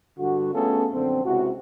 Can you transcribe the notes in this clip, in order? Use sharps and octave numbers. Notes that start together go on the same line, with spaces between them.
G2 D3 G3 F#4
A3 B3 C#4 F4 G#4 A4
A#1 F#2 D3 C4
C#2 C3 E4 F#4